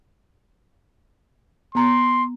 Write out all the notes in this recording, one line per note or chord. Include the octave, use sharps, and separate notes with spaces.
B3 A#5 C6